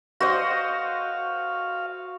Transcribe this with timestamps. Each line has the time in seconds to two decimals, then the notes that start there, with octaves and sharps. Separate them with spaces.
0.21 F#4 C5 D#5 F5